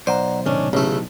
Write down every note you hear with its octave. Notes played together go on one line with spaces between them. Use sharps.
B1 C5 D5 F#5 A#5
A2 C3 D#3 C#4 D4
A1 C#3 A3